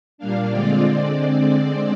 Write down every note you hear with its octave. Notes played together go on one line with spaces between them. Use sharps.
A#2 G3 A#3 D4 F5
D3 G#3 C4 F4 D5
D3 G#3 C4 D5